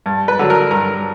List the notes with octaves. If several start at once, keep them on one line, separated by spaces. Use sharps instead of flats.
G2
B4
D3 F#3
A#4
G2 A#4